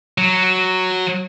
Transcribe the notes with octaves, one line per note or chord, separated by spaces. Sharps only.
F#3